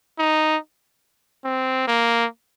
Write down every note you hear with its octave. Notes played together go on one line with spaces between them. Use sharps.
D#4
C4
A#3